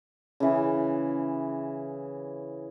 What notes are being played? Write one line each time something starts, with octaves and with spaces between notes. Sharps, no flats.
C#3 E3